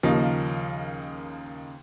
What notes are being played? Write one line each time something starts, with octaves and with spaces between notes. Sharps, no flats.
D#2 C#3 F3 A#3 D#4